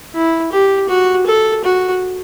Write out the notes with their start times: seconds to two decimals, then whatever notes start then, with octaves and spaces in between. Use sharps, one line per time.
0.14 E4
0.52 G4
0.89 F#4
1.27 A4
1.64 F#4